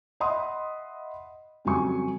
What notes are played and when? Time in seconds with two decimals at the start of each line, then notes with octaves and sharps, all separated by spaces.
0.20 D#5 E5 F#5 B5 C6 D#6
1.65 F2 C#3 F#3 G3 G#5 C#6